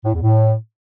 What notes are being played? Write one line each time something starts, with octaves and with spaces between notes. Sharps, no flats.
A2
E2
A2